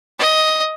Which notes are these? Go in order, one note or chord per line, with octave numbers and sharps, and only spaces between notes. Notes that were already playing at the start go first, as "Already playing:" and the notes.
D#5